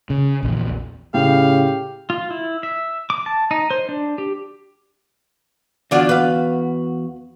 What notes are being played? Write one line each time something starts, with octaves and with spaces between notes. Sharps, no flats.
C#3
A#1 E2
A2 C#3 G4 F5
F4
E4
E5
D6
A5
D#4
C5
D4
G4
E2 D3 D4 F4 F#4
B4 F5